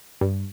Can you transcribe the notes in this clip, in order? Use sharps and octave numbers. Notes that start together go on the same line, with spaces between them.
G2